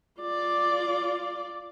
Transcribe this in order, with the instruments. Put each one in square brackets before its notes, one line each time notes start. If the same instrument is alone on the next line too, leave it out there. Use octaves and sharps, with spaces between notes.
[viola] F4 D5